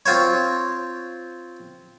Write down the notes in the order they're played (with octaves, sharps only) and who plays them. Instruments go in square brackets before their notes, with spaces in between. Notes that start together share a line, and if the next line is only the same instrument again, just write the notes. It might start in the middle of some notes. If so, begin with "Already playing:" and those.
[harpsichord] C4 F4 C5 C#5